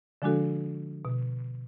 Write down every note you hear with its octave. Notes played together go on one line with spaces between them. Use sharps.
D3 F3 G#3 D4 F#4 A4
B2